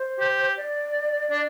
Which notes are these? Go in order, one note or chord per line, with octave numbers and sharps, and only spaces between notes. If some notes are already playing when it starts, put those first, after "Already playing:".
Already playing: C5
G4
D5
D4